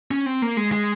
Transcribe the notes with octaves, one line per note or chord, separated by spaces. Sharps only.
C#4
C4
A#3
G#3
G#3